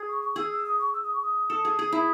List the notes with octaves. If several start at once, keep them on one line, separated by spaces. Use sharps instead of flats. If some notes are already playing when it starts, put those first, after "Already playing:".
Already playing: G#4
C#6
C#6
G#4 E6
E6
D#6
C#6
E6
D#6
C#6
D#6
A4
G#4
G#4
E4